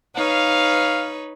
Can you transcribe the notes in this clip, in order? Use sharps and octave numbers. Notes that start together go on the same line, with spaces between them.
D#4 B4 C#5 F5